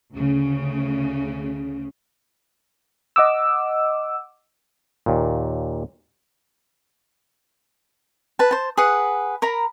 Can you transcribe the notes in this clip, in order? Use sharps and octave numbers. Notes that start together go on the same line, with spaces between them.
D2 C#3
D#5 F#5 D6 E6
D#2 A#2
B4 A5
C5 A5
G#4 B4 F#5
A#4 A#5 B5